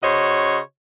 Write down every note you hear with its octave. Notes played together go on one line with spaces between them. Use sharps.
C#3 F#4 C5 C#5 D#5